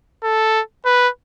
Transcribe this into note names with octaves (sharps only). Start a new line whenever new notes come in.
A4
B4